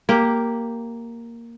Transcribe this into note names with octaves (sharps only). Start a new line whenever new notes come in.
A#3 G4